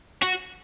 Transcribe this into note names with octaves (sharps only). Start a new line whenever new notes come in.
F#4